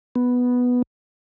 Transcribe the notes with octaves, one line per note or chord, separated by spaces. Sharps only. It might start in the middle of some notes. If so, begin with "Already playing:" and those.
B3